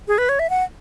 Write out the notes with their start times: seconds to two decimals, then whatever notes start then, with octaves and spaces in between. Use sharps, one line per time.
0.08 G#4
0.18 B4
0.29 C#5
0.39 E5
0.50 F#5